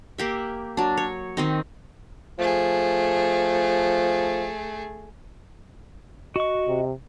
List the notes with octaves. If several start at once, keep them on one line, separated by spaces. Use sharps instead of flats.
A#3 G4 E5
F#3 D4
C#5
D#3 C4 D#4
F3 A3 G#4
F#4 D#5 C#6
C3